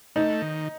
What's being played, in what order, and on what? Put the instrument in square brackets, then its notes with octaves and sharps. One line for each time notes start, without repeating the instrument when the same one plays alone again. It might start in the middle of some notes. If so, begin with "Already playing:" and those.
[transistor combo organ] A3 [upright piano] D#4
[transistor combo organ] D#3